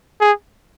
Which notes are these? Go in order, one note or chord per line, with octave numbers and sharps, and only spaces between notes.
G#4